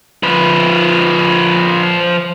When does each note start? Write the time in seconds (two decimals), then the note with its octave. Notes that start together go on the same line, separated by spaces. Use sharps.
0.23 F3 B4